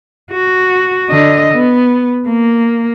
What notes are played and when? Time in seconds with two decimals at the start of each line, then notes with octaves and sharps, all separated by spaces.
0.32 F#4
1.10 D3 D#5
1.54 B3
2.27 A#3